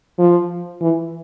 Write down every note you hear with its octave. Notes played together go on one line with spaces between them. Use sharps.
F3
E3